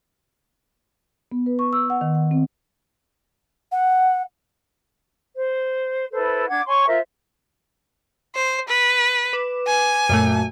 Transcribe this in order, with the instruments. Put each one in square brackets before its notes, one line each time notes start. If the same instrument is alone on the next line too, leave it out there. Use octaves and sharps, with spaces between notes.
[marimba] B3
B4
C#6
E6
F#5
D#3
F#5
C4
[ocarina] F#5
[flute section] C5
E4 A4 B4 C5
D4 F#5 D6 G#6
C#5 G#5 C6 C#6
F4 A#4 C5 E5
[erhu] C5
B4
[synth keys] B4 D6 E7
[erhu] G#5
[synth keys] F#2 A#2 A3